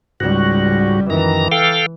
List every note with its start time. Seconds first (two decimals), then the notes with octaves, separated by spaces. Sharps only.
0.20 C#2 G#2 G3 F#4
1.10 F#2 D#3 E3 A#5
1.52 A4 F5 G5